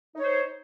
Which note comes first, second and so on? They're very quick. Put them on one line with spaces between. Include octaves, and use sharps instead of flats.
D#4 C#5 C5